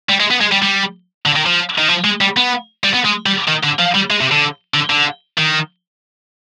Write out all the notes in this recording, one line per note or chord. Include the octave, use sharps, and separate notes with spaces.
G3
G#3
B3
G#3
G3
G3
D3
D#3
F3
D#3
F3
G#3
G3
B3
G3
B3
G#3
G3
D#3
D3
F3
G3
G#3
C3
D3
D3
D3
D#3